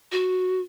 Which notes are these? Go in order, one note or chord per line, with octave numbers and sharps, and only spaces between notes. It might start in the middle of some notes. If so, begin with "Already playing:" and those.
F#4